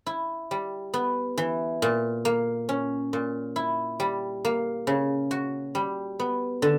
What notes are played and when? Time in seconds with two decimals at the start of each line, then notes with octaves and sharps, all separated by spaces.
0.06 E4
0.51 G3
0.94 B3
1.37 E3
1.82 A#2
2.25 A#3
2.69 C#4
3.13 A#2
3.56 E4
4.00 G3
4.45 A#3
4.87 C#3
5.31 F#4
5.75 G3
6.19 B3
6.62 D3